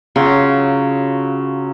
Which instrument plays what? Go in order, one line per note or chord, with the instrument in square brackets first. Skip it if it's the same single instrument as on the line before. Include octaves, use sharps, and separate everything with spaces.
[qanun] C#3 [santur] F#3 F4 F#4